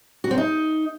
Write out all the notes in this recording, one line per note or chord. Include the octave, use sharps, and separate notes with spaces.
F#4
C4
D#4